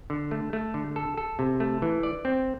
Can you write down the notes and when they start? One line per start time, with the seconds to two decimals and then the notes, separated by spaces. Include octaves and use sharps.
0.10 D3
0.31 A3
0.53 A3
0.74 D3
0.96 A4
1.17 A4
1.39 C3
1.60 A3
1.82 E3
2.03 D5
2.25 C4